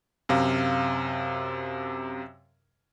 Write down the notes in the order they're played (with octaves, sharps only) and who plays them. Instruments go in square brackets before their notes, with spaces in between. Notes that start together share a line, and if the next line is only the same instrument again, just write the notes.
[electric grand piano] F#2 C3 F5